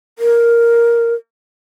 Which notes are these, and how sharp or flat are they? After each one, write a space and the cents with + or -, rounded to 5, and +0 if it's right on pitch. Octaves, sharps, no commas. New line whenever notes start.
A#4 +5